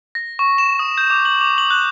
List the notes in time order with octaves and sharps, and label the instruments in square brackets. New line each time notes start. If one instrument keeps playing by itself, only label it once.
[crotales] A#6
C#6
E7
D#6
G6
D6
F#7
D6
F#7
F#6